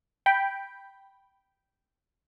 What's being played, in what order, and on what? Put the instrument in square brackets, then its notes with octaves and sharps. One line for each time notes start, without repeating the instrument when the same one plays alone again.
[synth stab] G5 B5